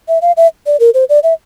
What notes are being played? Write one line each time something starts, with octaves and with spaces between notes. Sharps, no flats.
E5
F5
E5
D5
A#4
C5
D5
E5